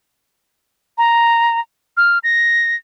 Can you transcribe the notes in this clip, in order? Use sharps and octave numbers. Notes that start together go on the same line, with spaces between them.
A#5
F6
A#6